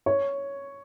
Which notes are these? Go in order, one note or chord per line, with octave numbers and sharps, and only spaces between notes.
C#5